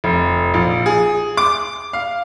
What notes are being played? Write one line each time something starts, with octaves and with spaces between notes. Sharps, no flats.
F1
A#1
G#4
D6
F5